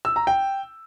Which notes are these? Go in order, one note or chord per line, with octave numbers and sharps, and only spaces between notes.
E6
A#5
G5